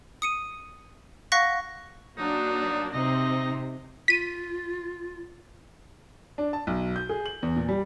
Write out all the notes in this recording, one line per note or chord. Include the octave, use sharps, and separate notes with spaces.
D#6 C#7 D#7
F5 F#5 C#6 F#6 A#6 B6
F#3 A#3 D4 D#4
C3 C4 D#4 D#5
F4 B6 D#7
D4
A5
B1
G6
G#4
F#7
E2
A#2
G3